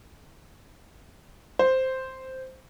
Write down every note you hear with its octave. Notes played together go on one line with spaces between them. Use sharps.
C5